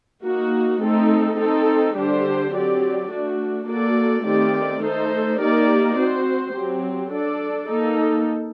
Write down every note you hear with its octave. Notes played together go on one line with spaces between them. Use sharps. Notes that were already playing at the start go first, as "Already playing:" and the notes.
A#3 D#4 F#4
A3 C4 D#4 A4
C4 D#4 A4
D3 G3 D4 G4 C5
F#3 C4 G4 D5
A3 D4 F#4
A#3 F#4 A4 D5
D#3 A3 C4 G4 D5
A3 D#4 A4 C5
A#3 D#4 G4 A#4 D5
C4 F#4 C5
F#3 C4 G4
D4 A4 D5
A#3 D#4 A4